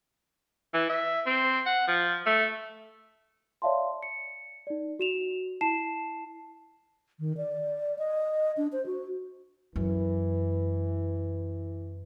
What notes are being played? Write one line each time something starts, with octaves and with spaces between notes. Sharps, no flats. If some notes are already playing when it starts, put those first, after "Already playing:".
E3
E5
C4
F#5
F3
A3
C#5 D5 E5 F5 A5 C6
C#7
D#4 D5
F#4 E7 F7
E4 A5 C7 E7
D#3
D5
D#5
D4
C5
F#4
F#2 E3